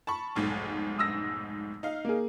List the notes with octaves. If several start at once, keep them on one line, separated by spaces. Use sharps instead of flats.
A5 B5 C#6
F1 B1 G#2
D#6 E6 A#6
D#4 F5
A#3 G#4